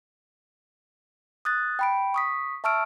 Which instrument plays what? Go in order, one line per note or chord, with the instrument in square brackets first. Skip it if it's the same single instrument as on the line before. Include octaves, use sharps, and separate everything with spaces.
[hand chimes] D#6 F#6 A6
G5 B5 D7
C#6 D#6 B6
E5 A5 C#6 E6 F6 D7